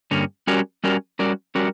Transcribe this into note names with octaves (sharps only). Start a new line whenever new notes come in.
G2 D3 A#3 C#4
G3 C#4 F#4 A#4 D5
G3 C#4 F#4 A#4 D5
G3 C#4 F#4 A#4 D5
G3 C#4 F#4 A#4 D5